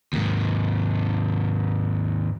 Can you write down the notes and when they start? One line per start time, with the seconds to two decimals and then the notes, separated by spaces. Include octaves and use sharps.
0.13 D#2 G#2